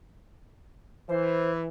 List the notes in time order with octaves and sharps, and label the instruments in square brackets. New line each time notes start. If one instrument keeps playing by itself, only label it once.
[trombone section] E3 [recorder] C5